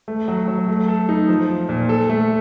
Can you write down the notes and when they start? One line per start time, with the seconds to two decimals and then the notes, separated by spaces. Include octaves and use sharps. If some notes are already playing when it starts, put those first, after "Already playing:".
0.08 A3
0.28 F#3
0.48 F#3
0.68 A3
0.88 A4
1.09 D#4
1.29 F3
1.49 F3
1.69 A#2
1.89 A4
2.10 A3